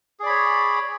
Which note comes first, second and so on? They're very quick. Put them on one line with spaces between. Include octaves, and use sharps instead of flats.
G#4 D5 B5 C#5